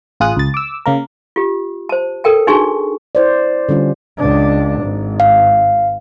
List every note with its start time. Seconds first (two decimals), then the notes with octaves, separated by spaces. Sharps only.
0.20 A1 F4 G#4 D#6 F#6
0.37 C#2 A6
0.54 D6 E6
0.86 C#3 A#3 A#4
1.36 F4 G4
1.89 C5 A5
2.24 A4 A#4 G5 A5
2.47 D4 D#4 F#4 G#4 G#5 C#6
3.15 E4 C5 D5
3.69 D3 G3 C#4 F4
4.17 C#2 D4
4.81 G#1
5.20 F5